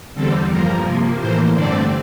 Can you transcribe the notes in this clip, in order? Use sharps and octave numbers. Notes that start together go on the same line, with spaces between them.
E2 D3 G3 C4 A4
G2 F3 A#3 A#4
C3 F3 A#3
A2 E3 A#3 C5
G2 D3 A3 C4 D5